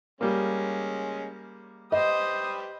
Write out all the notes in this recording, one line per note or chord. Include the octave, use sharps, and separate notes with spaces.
G3 G#3 A#3 C#4
G4 B4 C5 D#5 D#6